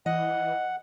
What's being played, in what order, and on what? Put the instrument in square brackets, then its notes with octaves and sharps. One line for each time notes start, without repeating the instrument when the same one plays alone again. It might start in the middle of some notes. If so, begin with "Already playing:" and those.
[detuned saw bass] E3 [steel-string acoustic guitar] D#5 [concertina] F#5